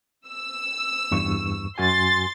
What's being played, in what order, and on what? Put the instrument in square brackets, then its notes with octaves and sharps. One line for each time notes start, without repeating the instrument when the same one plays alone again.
[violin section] E6
[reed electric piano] E2 G2 C#6
[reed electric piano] F#2 F#4 G#5 [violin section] C6 A6